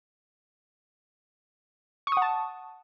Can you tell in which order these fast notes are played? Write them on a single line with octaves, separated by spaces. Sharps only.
C#6 D#6 F#5 A5